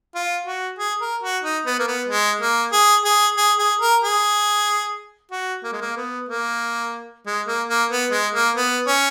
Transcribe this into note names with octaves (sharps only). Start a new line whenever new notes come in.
F4
F#4
G#4
A#4
F#4
D#4
B3
A#3
B3
G#3
A#3
G#4
G#4
G#4
G#4
A#4
G#4
F#4
A#3
G#3
A#3
B3
A#3
G#3
A#3
A#3
B3
G#3
A#3
B3
C#4